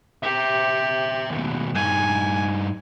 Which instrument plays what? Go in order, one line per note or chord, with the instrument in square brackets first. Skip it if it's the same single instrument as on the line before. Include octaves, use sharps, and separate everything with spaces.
[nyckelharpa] G4 [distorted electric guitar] C5 E5
[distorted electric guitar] D#2 B2
[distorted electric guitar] G2 D#4 [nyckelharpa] G#5